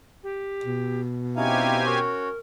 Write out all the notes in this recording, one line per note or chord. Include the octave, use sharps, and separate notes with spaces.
G4
B2
C4 C#4 D#4 E4 G4 F5 G#5
C#4 F#4 A#4 C#5